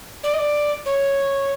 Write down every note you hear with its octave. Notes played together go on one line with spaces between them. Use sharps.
D5
D#5
D5
C#5